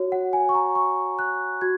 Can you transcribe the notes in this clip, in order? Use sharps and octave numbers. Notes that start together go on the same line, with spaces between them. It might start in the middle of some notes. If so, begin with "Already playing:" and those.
Already playing: F#4 C#5
F#5
G#5
C#6
A#5
C#6
F#6
F#4 G#6